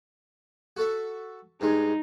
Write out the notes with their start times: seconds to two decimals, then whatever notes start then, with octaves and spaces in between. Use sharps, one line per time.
0.77 F#4 A4 E5
1.61 G2 G#3 D#4